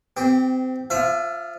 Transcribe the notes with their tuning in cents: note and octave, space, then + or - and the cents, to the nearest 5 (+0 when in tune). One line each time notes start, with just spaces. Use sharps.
C4 -25 G4 +0
F3 +0 E5 +30